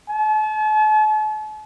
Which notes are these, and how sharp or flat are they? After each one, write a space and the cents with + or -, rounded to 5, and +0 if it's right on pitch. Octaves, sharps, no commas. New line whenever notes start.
A5 -40